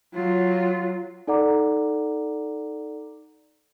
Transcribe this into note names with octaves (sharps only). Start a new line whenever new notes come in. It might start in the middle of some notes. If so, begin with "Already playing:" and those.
F#3 F4
D#4 A4 D5 F#5 A#5 D6